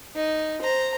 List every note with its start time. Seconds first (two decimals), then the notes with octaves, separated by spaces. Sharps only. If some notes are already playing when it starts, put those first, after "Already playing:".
0.16 D#4
0.62 C5 A#5